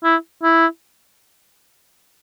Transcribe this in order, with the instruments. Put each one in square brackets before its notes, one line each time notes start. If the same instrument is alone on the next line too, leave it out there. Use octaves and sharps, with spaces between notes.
[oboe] E4
E4